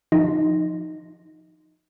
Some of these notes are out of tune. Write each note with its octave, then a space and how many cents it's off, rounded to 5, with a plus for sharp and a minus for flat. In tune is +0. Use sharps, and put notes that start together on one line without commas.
F3 +0 D#4 +0